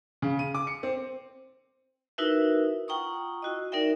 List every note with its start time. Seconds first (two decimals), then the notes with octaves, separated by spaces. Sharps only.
0.22 C#3
0.39 D#7
0.55 D6
0.67 C#7
0.83 C4
2.18 D#4 E4 F#4 A#4 B4 E5
2.88 F4 F#5 G5 A#5 C#6 D#6
3.42 E4 F#4 D#5
3.72 D#4 A#4 D5 E5 G5